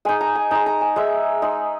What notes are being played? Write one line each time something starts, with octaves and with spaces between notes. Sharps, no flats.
G#3 D#4 G#5
A#5
G#5
G#3 D#4 A#5
A#5
G#5
G#3 D#4 E5
G#3 D#4